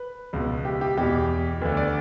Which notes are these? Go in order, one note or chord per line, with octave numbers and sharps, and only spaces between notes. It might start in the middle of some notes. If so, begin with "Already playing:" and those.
Already playing: B4
C#2 B2
G4
G4
E2 B2 G4
D2 D3 B4
D5